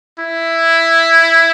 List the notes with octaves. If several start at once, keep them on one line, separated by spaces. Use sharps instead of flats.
E4